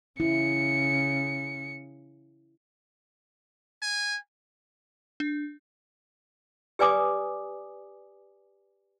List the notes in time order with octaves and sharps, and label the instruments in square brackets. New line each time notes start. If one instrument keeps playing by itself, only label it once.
[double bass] C#3 [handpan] E4 [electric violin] C#7
[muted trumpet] G#5
[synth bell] D4
[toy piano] G4 B4 D5 G#5 D6 D#6